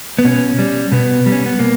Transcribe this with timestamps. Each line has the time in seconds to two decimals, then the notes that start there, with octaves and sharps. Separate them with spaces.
0.19 B3
0.25 B2 C#4
0.59 G3
0.92 B2 B3
1.26 G3
1.32 C#4
1.46 B3
1.59 B2 A#3